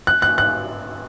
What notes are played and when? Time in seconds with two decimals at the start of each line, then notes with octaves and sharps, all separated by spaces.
0.07 F#6
0.22 F#6
0.38 F#6